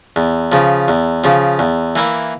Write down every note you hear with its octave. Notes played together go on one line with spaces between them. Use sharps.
E2
C#3 F3
E2
C#3 F3
E2
E3 A#3 E4